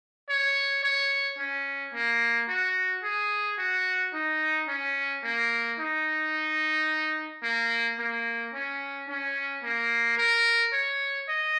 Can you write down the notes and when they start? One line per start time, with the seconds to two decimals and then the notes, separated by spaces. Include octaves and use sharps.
0.29 C#5
0.83 C#5
1.39 C#4
1.94 A#3
2.48 F#4
3.03 G#4
3.58 F#4
4.13 D#4
4.68 C#4
5.23 A#3
5.79 D#4
7.43 A#3
7.98 A#3
8.54 C#4
9.09 C#4
9.63 A#3
10.18 A#4
10.73 C#5
11.28 D#5